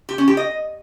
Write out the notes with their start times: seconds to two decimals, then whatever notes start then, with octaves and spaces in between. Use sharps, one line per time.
0.09 G4
0.18 C#4
0.28 G4
0.37 D#5